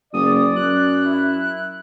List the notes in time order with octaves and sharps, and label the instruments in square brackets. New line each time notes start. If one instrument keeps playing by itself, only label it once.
[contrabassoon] F#1 [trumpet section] D5 [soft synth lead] D#6
[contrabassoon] F#2 [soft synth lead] F#6
[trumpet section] E4